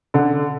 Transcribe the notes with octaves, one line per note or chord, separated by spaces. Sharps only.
D3